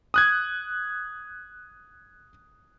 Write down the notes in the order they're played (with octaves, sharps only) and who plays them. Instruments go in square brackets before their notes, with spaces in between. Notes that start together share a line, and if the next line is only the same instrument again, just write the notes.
[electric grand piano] D#6 F#6 G#6